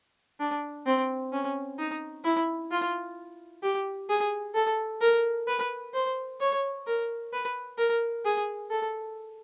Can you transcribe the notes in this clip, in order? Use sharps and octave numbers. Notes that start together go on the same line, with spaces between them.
D4
C4
C#4
D#4
E4
F4
G4
G#4
A4
A#4
B4
C5
C#5
A#4
B4
A#4
G#4
A4